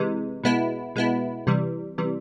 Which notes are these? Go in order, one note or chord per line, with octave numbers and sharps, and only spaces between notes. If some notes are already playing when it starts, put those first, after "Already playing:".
Already playing: C3 E3 G#3
B2 G#3 B3 E4
B2 G#3 B3 E4
C3 E3 G3
C3 E3 G3